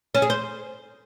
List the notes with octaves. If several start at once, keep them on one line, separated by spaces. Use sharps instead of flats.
C#4
G#4
C5